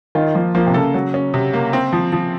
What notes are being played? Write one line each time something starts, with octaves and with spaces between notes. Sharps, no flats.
D#3 F4
F3 A#3
F3 A#3
C3
C#3 A4
F#3
C#4
C3
A#3
C4
F3
F3